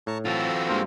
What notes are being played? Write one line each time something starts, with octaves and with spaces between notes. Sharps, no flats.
A2 A5 A#5 C#6
E3 C4 F4 F#4 A4
G2 G#3 A#3 F4 C5